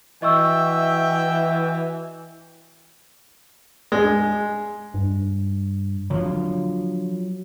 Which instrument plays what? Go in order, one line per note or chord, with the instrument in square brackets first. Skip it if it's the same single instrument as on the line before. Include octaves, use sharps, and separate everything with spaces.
[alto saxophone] E3 [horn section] F#4 E5 G5 [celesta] D#5 C#6 E6
[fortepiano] G#3
[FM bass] G2
[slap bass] D3 F3 [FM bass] F#3